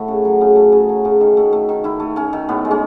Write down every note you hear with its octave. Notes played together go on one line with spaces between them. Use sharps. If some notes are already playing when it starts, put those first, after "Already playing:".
Already playing: A2 A3 F#4
C#3
F#3
C#3
A3
C#3
F#3
C#3
D#3
A3
A3
D#3
D#3 E4
A3
A3 C#4
D#3
A2 B3
G#3
C#4